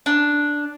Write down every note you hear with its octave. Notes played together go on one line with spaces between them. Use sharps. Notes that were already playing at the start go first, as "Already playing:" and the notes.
D4